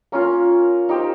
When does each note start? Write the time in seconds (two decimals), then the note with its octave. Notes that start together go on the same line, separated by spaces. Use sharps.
0.12 A#3 C#4 F4 A#4
0.89 D#4 G4 C5